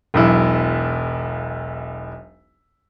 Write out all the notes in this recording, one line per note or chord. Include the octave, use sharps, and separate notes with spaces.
E1 B1 E4